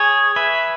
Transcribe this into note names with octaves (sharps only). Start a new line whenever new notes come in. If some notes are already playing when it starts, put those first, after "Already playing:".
Already playing: G#4 C#5
B4 E5